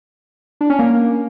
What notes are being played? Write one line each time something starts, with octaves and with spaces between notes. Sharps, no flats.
D4
C#4
A#3